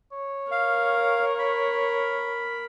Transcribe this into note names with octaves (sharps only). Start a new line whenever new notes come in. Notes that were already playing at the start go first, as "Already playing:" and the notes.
C#5
A#4 F5
B5